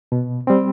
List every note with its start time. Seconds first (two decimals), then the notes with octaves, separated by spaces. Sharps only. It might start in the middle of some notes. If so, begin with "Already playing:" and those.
0.12 B2
0.47 G3 C4